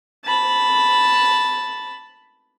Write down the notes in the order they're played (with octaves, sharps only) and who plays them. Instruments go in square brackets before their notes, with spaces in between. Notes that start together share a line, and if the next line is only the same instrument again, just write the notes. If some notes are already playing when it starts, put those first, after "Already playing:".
[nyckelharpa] A5 B5